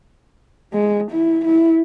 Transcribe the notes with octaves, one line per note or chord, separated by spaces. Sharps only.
G#3
E4
E4